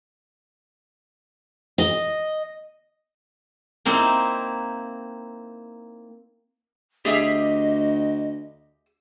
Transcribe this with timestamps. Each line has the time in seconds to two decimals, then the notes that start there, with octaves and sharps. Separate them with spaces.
1.78 D#5
3.85 A#3 C4 D#4 E4
7.05 D2 G4 G#4 D#5 E5